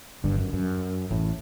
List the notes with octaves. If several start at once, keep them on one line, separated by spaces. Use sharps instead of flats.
G1 G2
F#2
F#2
A1 A2